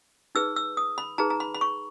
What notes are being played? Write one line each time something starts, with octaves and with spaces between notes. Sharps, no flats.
D#4 G#4 B4 E6
E6
D#6
B5
D#4 G#4 B4 A#5
A#5
B5
B5
C#6